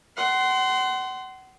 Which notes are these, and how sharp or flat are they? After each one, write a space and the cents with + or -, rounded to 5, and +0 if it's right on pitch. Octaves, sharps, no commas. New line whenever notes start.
F#5 +35 C6 -10